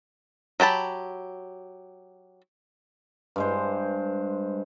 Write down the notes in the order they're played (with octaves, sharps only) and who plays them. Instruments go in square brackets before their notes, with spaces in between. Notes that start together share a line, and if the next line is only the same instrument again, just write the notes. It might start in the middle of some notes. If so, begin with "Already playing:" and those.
[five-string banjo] F#3 G4 A5 B5
[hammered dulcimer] G2 G#3 C5